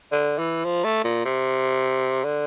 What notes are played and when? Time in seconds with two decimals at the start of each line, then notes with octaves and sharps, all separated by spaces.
0.12 D3
0.38 E3
0.65 F3
0.84 A3
1.04 A#2
1.25 C3
2.24 D3